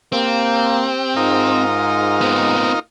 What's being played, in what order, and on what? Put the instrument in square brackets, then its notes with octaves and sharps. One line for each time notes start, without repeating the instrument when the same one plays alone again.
[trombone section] A#3 [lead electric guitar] C4 [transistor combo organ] G4
[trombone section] G#2 [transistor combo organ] D#4 F4 A#4
[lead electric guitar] B3 C4